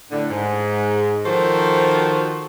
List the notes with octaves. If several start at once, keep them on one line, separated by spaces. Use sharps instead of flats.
A2 D3
G#2
D#3 F3 F#4 A4 C5